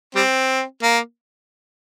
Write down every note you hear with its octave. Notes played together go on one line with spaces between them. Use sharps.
G3 C4
A#3